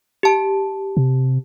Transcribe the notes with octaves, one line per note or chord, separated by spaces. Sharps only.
G4 A5
C3